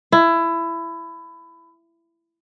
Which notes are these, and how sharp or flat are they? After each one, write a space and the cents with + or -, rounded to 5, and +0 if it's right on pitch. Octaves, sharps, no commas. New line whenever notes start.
E4 +20